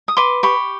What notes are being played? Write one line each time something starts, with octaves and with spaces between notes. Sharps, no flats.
D#6
B4 C6 D6
G4 B5 C#6